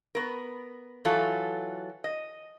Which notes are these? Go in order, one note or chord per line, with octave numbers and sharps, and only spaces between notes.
B3 A#4
E3 F#3 F4 A4
D#5